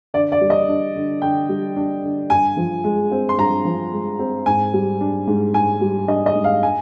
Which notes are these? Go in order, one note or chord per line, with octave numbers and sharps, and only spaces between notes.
D3 D5
D5
G3
D#5
D4
D3
D3 G5
G3
D4
D3
G2 G#5
F3
G#3
C4
C6
G2 A#5
F3
G#3
C4
G#2 G#5
G3
D4
G#2
G#2 G#5
G3
D4 D#5
D#5
G#2
F5
G#5